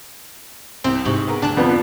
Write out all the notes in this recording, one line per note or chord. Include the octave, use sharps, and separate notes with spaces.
C2 C4
G#2 C3 D#4 C#6 F#7
B3 G#4 A#4
D2 D4 A5 F#6
F2 B3 D5